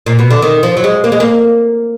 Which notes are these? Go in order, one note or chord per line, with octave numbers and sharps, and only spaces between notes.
A#2
B2
D3
D#3
F3
F#3
G#3
A#3
G#3
A#3